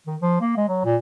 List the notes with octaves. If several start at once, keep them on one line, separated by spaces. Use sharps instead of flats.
D#3
F3
A#3
G#3
F#3
A#2